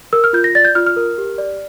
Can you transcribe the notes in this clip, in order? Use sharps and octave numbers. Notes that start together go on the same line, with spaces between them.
A#4 E6
F6
F4 G6
A#6
D5 A6
G6
F4 F6
F6
A#4
G4
D5